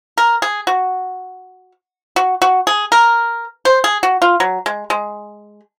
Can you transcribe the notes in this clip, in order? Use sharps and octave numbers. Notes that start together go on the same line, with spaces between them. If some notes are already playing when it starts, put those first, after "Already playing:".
A#4
G#4
F#4
F#4
F#4
G#4
A#4
C5
G#4
F#4
F4
F#3
G#3
G#3